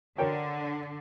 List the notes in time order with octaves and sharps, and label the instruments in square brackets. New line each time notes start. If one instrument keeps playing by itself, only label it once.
[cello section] D3 [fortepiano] A#4 C#5 G5